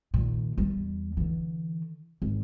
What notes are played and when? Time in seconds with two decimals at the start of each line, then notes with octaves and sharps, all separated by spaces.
0.14 A#2 D#3
0.58 E2 G3
1.17 D3 E3
2.22 G#1